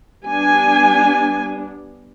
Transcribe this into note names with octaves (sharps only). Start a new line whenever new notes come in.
G3 B3 D4 G#5